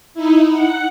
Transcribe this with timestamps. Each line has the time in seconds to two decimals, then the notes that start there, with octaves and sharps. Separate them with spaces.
0.14 D#4 E4
0.51 F#5